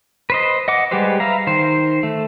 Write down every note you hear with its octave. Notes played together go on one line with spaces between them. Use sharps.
B4 C5 D#5
D#5 F#5 D6
G3 G#3 G4 B4 C5
B4 E5 F5 A#5
D#3 C5
A3